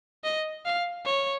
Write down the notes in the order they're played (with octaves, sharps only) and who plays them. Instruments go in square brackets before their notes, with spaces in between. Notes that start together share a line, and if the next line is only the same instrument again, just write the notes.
[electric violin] D#5
F5
C#5